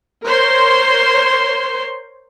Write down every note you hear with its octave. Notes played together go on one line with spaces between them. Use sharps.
A#4 C5 C#5 C6